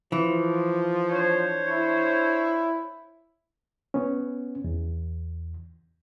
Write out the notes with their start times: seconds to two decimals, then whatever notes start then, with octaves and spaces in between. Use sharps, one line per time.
0.12 E3 F3
1.10 D4 C5 C#5
1.69 E4
3.94 B3 C#4
4.64 E2